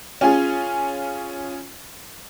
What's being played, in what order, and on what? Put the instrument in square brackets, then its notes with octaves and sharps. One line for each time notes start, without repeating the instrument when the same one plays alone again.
[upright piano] C#4 F4 G#4